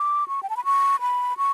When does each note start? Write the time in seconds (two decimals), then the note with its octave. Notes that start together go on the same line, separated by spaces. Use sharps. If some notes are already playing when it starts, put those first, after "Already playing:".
Already playing: D6
0.28 C#6
0.43 G5
0.50 A5
0.57 B5
0.65 C#6
1.00 B5
1.37 C#6